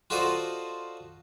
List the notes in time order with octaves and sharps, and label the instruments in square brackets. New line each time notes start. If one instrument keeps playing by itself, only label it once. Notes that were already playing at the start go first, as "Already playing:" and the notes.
[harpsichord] F4 F#4 A4 C5 D5 D#5